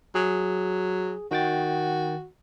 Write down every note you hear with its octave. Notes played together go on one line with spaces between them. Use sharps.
F#3 G#4
D#3 F#4 G5 A6